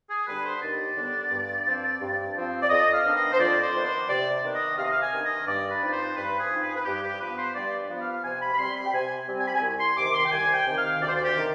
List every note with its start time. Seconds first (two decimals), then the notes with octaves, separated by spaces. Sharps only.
0.09 G#4
0.27 D3 G3 B3 D4 B4
0.44 C5
0.61 D#2 D5
0.96 D3 G3 B3 D4
1.31 G2
1.65 F3 C4
2.00 G2
2.35 F3 C4
2.62 D5
2.69 F2 D#5
2.93 F5
3.04 D#3 B3 D4
3.15 D#5
3.32 C5
3.39 F2 D5
3.61 C5
3.73 D#3 B3 D4
3.85 C5
4.08 C3 D5
4.42 D#3 B3 D4
4.54 D#5
4.77 C3 F5
4.84 D#5
4.91 F5
5.00 G#5
5.12 D#3 B3 D4
5.23 D#5
5.46 G2 D5
5.70 B4
5.81 F3 C4 D#4 D5
5.92 C5
6.15 G2 B4
6.39 G#4
6.50 F3 C4 D#4
6.62 B4
6.68 G#4
6.76 B4
6.85 G2 G4
7.02 G4
7.19 F3 B3 B4
7.37 C5
7.54 G2 D5
7.89 F3 B3
8.00 F5
8.23 C3 G#5
8.40 B5
8.52 B5
8.58 G3 C4 C6
8.75 B5
8.85 G5
8.93 C3 G#5
9.27 G3 C4
9.39 G#5
9.46 B5
9.54 G#5
9.62 C2
9.79 C6
9.97 C3 D#3 D6
10.14 C6
10.25 G5
10.31 C2 G#5
10.54 G5
10.65 C3 D#3
10.77 F5
11.00 D2 D5
11.08 C5
11.15 D5
11.24 G4
11.35 C3 D#3